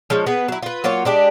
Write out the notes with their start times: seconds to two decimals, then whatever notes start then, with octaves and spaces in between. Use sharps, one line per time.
0.10 F3 G#3 C#4
0.26 B3 G#4 B4
0.48 F#3 E4
0.62 F4 B4
0.84 F#3 A#3 F4 C#5
1.05 G#3 D4 G4